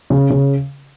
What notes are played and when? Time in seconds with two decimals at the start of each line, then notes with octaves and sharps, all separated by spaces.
0.10 C#3
0.30 C#3